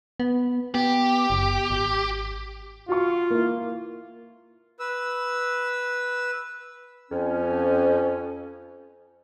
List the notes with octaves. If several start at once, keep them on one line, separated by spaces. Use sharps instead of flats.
B3
B3 G4
F#1
G#1
F4 F#4 C#6
A#3 E4
B4 E6
F2 C#4